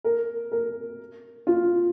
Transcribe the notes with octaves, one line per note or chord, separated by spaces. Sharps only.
A#4
A#4
F4